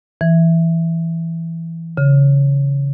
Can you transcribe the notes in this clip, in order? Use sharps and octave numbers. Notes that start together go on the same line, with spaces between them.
E3
C#3